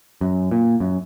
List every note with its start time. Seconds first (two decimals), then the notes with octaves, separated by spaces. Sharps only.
0.21 F#2
0.51 A#2
0.80 F#2